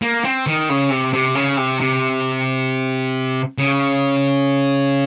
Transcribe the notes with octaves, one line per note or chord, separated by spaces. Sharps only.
A#3
C4
D#3
C#3
C3
C3
C#3
C3
C3
C#3